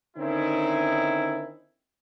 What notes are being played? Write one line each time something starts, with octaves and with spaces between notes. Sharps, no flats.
D3 D#3 C4 C#4 D#4 E4